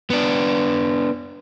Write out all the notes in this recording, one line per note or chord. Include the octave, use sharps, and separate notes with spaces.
B3 D4